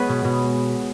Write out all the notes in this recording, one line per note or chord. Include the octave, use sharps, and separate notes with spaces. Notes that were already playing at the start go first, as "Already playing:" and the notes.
Already playing: G#3 B3 G#4 B4 C#5
B2
B2